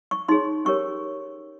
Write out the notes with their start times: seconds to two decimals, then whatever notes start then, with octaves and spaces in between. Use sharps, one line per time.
0.11 C#6
0.28 D#4 G#4 C#5 C6
0.65 C#4 G4 A#4 C#5 C#6